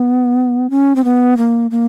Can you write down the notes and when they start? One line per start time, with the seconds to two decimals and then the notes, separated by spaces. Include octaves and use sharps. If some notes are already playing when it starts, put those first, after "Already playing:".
Already playing: B3
0.70 C#4
0.96 C4
1.04 B3
1.37 A#3
1.71 A#3